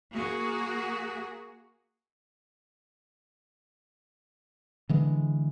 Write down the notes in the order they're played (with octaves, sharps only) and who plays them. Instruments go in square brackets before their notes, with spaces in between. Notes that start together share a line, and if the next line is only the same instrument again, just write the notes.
[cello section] A#3 F#4 G#4
[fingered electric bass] D3 E3 G#3